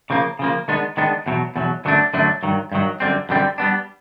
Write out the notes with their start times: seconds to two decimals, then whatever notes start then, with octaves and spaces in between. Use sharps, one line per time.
0.10 C#3 F3 A#3
0.39 C#3 F3 A#3
0.68 D#3 G#3 B3 D4
0.97 D#3 G#3 B3 D4
1.26 E2 B2 F#3
1.56 E2 B2 F#3
1.85 F#2 D3 F#3 A3 D4
2.14 F#2 D3 F#3 A3 D4
2.43 G2 D#3 F#3
2.72 G2 D#3 F#3
3.00 F#2 D3 G3 C4
3.29 F#2 D3 G3 C4
3.58 G3 B3 D4